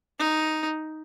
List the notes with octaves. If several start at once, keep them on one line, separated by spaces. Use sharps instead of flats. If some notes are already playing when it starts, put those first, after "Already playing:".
D#4